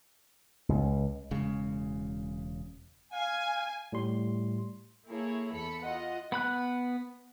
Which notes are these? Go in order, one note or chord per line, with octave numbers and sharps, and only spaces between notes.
C#2
E1 C#3 G#3
F5 G#5
A2 G3 C6
A#3 E4 G#4 A4 C#5
E2 A4 B5 C#7
F4 D#5 F#5
B3 B5 F#6